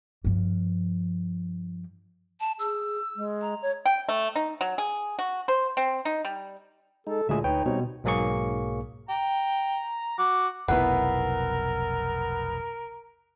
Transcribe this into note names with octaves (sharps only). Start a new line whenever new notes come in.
G2 F3
A5
G#4 E6
G#3
A#5
C#5
G5
A3
D#4
F#3
G#4
F#4
C5
C4
D#4
G3
G#3 D#4 A4
D2 A#2 G#3 G#4 E5
D2 D#4 B4 C#5 G5
B2 G3 C4 C#5
B1 G#2 F#3 A#3 G#4 C#6
G5 A#5
F#4 D6
F1 B1 B3 E4 A#4 B4 F#5